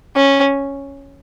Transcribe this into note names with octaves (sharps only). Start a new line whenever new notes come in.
C#4